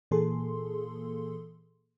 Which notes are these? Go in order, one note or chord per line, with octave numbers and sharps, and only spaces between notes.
A#2 E3 A#3 G#4 A4 C6